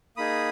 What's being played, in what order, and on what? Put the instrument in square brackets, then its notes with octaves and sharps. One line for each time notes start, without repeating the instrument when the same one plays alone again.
[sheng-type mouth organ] A#3 D#4 G#4 B5 D#6